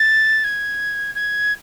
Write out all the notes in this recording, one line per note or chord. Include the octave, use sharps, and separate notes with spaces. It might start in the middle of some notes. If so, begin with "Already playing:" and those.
Already playing: A6
G#6
G#6